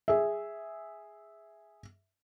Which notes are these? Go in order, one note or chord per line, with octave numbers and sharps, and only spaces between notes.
G#4 E5